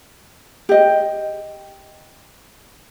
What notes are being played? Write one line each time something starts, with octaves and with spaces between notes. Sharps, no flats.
G4 D#5